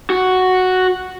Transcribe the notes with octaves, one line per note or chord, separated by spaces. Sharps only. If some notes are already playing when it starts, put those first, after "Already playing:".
F#4